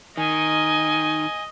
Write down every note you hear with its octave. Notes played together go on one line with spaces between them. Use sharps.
D#3 D#5 G#5